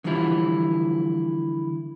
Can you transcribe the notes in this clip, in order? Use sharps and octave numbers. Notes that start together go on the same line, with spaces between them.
D3 E3 F3 G3 E4 F4